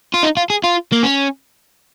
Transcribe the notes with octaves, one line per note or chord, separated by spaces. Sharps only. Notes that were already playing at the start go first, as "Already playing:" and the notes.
F4
D#4
F4
G#4
F4
A#3
C#4